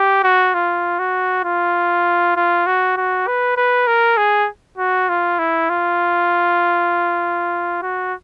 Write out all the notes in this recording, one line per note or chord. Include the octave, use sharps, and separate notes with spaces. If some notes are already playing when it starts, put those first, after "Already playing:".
Already playing: G4
F#4
F4
F#4
F4
F4
F#4
F#4
B4
B4
A#4
G#4
F#4
F4
E4
F4
F#4